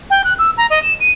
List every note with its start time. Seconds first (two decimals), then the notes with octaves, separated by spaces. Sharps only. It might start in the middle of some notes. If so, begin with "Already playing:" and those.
0.10 G5
0.24 F#6
0.39 E6
0.58 A#5
0.70 D#5
0.83 E7
1.00 D#7